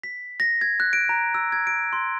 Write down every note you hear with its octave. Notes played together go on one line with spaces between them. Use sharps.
B6
A#6
G#6
F#6
D7
A#5
E6
G#6
D7
C6